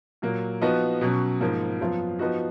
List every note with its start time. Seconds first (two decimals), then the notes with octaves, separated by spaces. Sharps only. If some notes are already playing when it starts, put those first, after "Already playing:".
0.22 A#2 F#3 A#3
0.61 F3 B3 D#4 F#4
1.01 B2 F#3 C#4
1.41 G#2 F3 A#3
1.81 F#2 F3 B3 F4
2.19 F3 B3 D#4 F#4